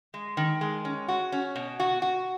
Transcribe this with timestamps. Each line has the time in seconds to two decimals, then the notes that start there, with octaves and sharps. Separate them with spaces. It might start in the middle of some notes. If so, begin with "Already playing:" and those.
0.14 G#3
0.37 D#3
0.61 G#3
0.85 C#4
1.08 F#4
1.32 C#4
1.56 B2
1.80 F#4
2.02 F#4